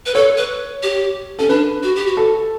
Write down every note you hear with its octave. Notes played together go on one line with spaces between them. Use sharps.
B4
A4 C#5
B4
G4
C#4 A4
D4 B4
F#4
G4
F#4
A4